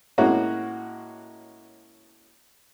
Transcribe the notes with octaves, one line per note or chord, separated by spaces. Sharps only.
A2 G#3 A#3 C#4 F#4